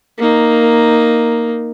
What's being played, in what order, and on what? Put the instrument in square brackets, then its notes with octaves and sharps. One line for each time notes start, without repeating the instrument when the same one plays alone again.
[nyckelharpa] A#3 D#4